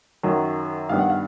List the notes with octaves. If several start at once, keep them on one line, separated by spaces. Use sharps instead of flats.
F#2 D#3 F#3
G2 D#3 G3 B3 D4 F5
F#5
F5